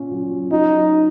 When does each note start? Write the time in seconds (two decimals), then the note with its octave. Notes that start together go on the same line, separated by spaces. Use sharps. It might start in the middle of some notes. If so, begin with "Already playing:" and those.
Already playing: A#2 C#4
0.12 F#3
0.51 F#3 D#4